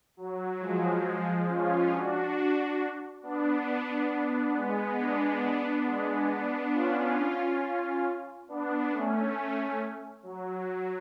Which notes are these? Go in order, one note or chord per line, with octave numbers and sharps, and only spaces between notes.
F#3
F3 G#3
C#4 F4
D4 F#4
B3 D4
G#3 B3
B3 D4
G#3 B3
B3 D4
C#4 F4
B3 D4
A3 C#4
F#3